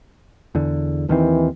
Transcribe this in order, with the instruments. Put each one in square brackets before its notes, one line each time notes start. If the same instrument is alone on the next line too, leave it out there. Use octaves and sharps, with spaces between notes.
[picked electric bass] E2 D3
[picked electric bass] D#2 D#3 C4 [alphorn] E3